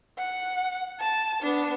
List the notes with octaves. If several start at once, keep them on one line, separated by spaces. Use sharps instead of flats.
F#5
A5
B3 D4